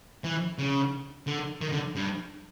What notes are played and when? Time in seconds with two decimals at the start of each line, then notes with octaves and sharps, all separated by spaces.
0.24 E3
0.59 C#3
1.27 D3
1.61 D#3
1.73 D3
1.96 G2